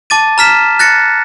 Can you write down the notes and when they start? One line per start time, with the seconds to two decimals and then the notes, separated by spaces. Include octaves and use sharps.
0.10 A5 D6 A6 D#7
0.38 A#5 F6 B6 E7
0.79 F#6 A6 A#6 C#7